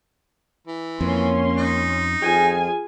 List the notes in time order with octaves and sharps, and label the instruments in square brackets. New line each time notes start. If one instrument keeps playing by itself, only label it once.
[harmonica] E3
[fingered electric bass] F2 [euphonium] A#3 [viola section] C#4 C6
[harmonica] D#4
[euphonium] F2 [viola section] F4 G#4 G#5